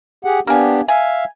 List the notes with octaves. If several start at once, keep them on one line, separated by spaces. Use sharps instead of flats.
G4 G#4 F#5
A#3 B3 D4 G4 G#5
E5 F5 G#5